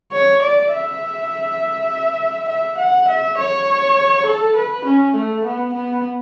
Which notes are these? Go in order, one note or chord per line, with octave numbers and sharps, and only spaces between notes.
C#5
D5
E5
E5
F#5
E5
C#5
A4
B4
C#4
A3
B3
B3